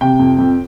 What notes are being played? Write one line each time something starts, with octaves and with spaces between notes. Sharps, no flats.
C3 G5
F2
F2